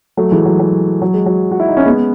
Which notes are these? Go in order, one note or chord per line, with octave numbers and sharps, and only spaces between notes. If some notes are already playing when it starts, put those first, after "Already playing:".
F#3 A3
E3 G#3
F#3
F#3
F#3
G#3
F#3
F#4
E4
D#4
C#4
G#3 B3